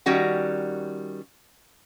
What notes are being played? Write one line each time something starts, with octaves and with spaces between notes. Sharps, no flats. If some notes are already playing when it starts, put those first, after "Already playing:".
D#3 G3 C#4 F#4 F#5